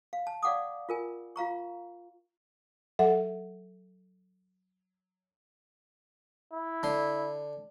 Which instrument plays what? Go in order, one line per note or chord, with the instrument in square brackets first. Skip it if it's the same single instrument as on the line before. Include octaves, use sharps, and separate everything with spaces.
[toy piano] F5
A5
D5 F5 F#5 D6 D#6
F4 A#4 G#5
F4 F5 A#5 C#6
[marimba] F#3 A4 E5 F#5
[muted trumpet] E4
[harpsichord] D3 C6